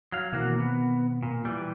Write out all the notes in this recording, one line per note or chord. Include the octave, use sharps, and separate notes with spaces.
F#3 F5
B2 D#3 E3 A#3 C4 F#4
B3
A#2
E3 G3